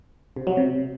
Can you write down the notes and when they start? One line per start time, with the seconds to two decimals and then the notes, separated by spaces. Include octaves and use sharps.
0.36 C3
0.47 F#3
0.57 C3